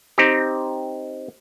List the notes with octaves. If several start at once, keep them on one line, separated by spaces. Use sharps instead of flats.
C4 D#4 G4